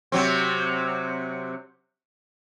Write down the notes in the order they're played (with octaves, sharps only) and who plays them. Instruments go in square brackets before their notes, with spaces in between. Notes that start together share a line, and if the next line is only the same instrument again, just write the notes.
[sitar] C3 F#3 C4